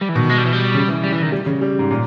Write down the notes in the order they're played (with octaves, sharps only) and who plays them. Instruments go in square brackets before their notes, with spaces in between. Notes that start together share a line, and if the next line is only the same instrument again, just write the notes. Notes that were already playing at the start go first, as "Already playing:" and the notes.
[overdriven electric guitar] G3
E3
[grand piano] B2 [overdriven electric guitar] D#3
[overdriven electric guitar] G#3
G3
E3
G3
[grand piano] C#3
E3
[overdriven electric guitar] G3
E3
D#3
[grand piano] G3
C#3
G3
G#2
A#2